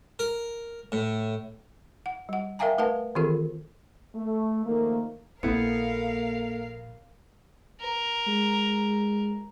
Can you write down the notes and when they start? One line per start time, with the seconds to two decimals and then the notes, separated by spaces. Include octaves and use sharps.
0.19 A#4
0.92 A2
2.06 F#5
2.29 G3 F#5
2.59 A#4 E5 F5 G5 G#5 A#5
2.78 A3 A#4 B4 F5 F#5 A5
3.15 D#3 E3 C4 F4 G#4 A4
4.15 A3
4.66 D#3 F3 A3 A#3
5.43 A#1 A#3 B3 E4 A4 A#4 F5 C#7
7.81 A#4
8.27 G#3